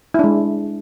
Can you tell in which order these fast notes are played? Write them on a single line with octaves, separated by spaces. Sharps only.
E4 D4 G#3